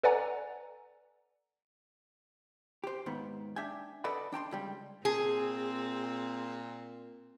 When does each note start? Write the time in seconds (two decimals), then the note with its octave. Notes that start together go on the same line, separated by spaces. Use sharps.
0.03 A4 B4 D5 F#5 G#5 A#5
2.84 G4 C5
3.06 D#2 G#2 D#3 B3
3.56 D4 E5 G5 G#5
4.04 A4 B4 D5 D#5 F#5 B5
4.32 D4 G5 A5 C6
4.51 C#2 G3 G4
5.05 A#2 C4 G#4